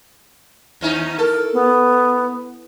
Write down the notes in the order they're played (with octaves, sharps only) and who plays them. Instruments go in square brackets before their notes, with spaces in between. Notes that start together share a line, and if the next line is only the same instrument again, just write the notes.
[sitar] D#2 C#4 D#4
[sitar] A4 [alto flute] A#4
[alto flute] B3